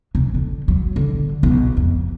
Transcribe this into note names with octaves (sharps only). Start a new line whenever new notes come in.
C3
D3
F#3
D3
B1
F2